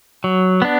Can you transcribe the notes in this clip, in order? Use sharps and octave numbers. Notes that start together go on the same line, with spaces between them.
F#3
B3 D4